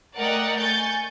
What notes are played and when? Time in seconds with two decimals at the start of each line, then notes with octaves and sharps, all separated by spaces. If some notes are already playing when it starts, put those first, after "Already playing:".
0.17 A3 A#4 D5 D#5 F#5 G5
0.59 G#5 C#6 G6 A6